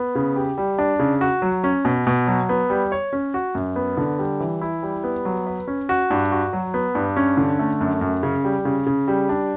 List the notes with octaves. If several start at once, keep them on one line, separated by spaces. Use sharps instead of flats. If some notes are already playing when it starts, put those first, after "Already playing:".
Already playing: B3
C#3
G4
G3
D4
C#3
F#4
F#3
C#4
B2
B2
F#3
B3
G3
C#5
C#4
F#4
F#2
B3
D3
G3
E3
E4
G3
B3
F#3
B4
C#4
F#4
G2
F#4
F#3
B3
G2
C#4
D3
A3
F#2
F#2
C#3
G3
C#3
C#3
G3
D4